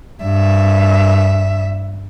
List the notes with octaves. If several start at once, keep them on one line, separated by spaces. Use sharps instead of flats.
G2 E5